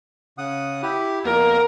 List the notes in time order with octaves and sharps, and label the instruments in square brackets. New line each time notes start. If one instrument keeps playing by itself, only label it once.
[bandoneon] C#3 F#5 D#6
E4 G4
[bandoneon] F2 A#3 B3 [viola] A#4